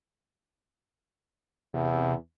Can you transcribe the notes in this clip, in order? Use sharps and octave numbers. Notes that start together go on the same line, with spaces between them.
E2 C3